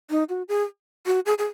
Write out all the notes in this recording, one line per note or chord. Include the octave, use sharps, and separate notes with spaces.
D#4
F#4
G#4
F#4
G#4
G#4